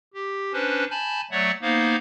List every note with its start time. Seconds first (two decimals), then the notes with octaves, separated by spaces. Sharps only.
0.14 G4
0.53 C#4 D4 B4 C5
0.91 G#5 A5 B5 G6
1.31 F#3 A3 C#5 D5 E5 F#5
1.61 A#3 B3 D#4 C5 F5